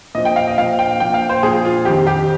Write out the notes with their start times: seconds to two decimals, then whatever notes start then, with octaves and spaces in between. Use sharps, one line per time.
0.15 A#2 D#5
0.18 F3
0.25 G5
0.36 F5
0.47 D#5
0.58 A#2 F3 F5
0.79 G5
1.00 A#2 F3 G5
1.14 F5
1.29 C5
1.43 A#2 F3 G#4
1.65 F4
1.85 F2 D#3 G4
2.07 G4